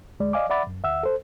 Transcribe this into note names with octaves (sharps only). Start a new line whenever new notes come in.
D2 G#3 D5
D5 D#5 F5 G#5 D6
D5 E5 F#5 B5 D6 A6
F#2
D2 E5 F#5 E6
A4 C5